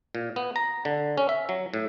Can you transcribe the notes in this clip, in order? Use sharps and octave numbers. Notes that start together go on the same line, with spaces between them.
A#2
B3
A#5
D3
C#4
E5
F#3
A2